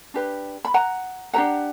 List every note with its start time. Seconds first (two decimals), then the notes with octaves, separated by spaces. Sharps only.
0.14 D4 G4 B4
0.65 B5
0.74 F#5 A#5
1.33 D4 G4 B4 F#5 A#5